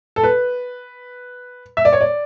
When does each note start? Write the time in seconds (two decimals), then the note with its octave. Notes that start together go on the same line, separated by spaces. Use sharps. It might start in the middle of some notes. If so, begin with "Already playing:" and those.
0.16 A4
0.24 B4
1.77 E5
1.85 D5
1.93 C#5
2.01 D5